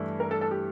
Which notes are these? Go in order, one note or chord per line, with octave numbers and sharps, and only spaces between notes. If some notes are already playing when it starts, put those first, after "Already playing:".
Already playing: G2 E3 A3 E4
A#4
A4
A4
G4